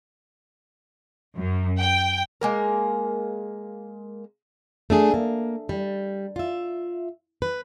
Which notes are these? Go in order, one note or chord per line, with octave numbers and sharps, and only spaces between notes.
F#2
G5
G#3 A#3 A#4
A3 D4 G#4
A#3
G3
F4 E5
B4